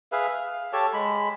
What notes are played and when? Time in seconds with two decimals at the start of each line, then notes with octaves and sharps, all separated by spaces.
0.12 G#4 B4 E5 F5
0.31 F5
0.73 G4 A4 C#5 A5
0.93 G#3 B5